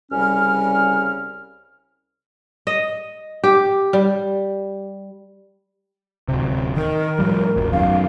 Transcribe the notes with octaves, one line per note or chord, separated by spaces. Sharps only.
C2 C#3 G3 C#4 F6
D#5
G4
G3
D1 C3
D#3 A#4
A2 F3 G3
D#1 G#1
F#2 D3 D#3 F5